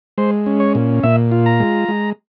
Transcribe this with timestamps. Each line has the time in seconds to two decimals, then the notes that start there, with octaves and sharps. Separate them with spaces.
0.18 G#3 C5
0.46 C#4
0.60 C#5
0.75 A#2
1.03 A#2 E5
1.32 F4
1.46 A#5
1.60 G#3
1.88 G#3